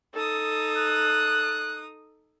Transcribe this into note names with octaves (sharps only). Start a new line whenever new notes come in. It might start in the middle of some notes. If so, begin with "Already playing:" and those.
D#4 A4 D#6
F#6